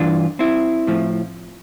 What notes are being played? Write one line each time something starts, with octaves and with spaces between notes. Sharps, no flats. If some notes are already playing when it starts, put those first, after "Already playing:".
Already playing: G2 E3 D4 F4
C4 E4
A2 F3